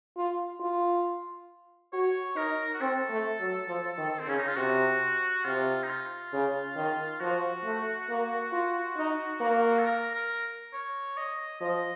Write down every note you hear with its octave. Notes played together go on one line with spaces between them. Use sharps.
F4
F4
F#4 C#5
D#4 A#4
F#4
C4 A4
A3
F#3
F3
D#3
C4
C#3 C#4
D#4
F4
C3 F#4
C3 F4
D#4
F4
C#3
D#3
F3 F#4
A3
A#3
F4
D#4
A#3
A4
A#4
A#4
C#5
D#5
F3 D#5